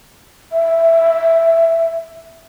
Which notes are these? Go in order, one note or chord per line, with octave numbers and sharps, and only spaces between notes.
E5